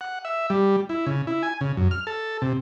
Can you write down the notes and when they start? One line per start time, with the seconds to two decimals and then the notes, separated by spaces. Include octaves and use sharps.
0.01 F#5
0.25 E5
0.50 G3
0.89 E4
1.06 C#3
1.27 E4
1.43 G#5
1.61 C#3
1.77 F#2
1.91 F6
2.07 A4
2.42 C3